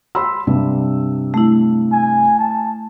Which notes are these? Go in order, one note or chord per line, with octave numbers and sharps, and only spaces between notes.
B5 C6 E6
G2 C3 D4
A3 E4
G#5
A5